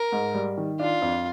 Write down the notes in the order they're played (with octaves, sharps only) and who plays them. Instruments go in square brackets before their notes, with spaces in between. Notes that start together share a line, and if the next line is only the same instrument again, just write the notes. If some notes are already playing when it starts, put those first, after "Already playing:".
Already playing: [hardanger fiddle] A#4
[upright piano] G#2
G3
D#3
[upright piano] D4 [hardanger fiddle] F4
[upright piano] F2